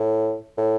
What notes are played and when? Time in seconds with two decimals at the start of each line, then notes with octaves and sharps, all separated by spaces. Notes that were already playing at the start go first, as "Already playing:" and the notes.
Already playing: A2
0.57 A2